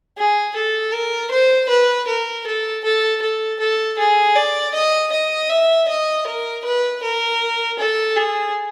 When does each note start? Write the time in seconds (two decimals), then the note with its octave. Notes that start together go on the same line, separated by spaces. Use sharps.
0.17 G#4
0.55 A4
0.93 A#4
1.31 C5
1.69 B4
2.07 A#4
2.46 A4
2.84 A4
3.22 A4
3.60 A4
3.98 G#4
4.35 D5
4.74 D#5
5.12 D#5
5.50 E5
5.88 D#5
6.27 A#4
6.65 B4
7.03 A#4
7.79 A4
8.16 G#4